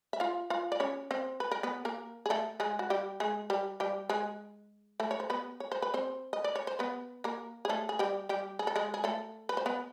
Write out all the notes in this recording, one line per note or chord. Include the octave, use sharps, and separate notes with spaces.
E5
F4 F5
F4 F5
D5
C#4 C#5
C4 C5
B4
A#4
B3 B4
A#3 A#4
G#4
A3 A4
G#3 G#4
F#4
G3 G4
G#3 G#4
G3 G4
G3 G4
G#3 G#4
A3 A4
C#5
C5
B3 B4
C#5
C5
B4
C4 C5
D#5
D5
C#5
C5
B3 B4
A#3 A#4
G#4
A3 A4
G#4
G3 G4
G3 G4
G#4
A4
G#3 G#4
G#4
A3 A4
B4
C5
B3 B4